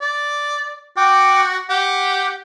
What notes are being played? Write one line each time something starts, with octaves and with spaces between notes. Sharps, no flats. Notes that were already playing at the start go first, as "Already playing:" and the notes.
D5
F#4 G5 D6
G4 F#5